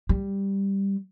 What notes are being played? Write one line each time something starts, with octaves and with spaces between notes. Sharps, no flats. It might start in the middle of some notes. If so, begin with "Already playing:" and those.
G3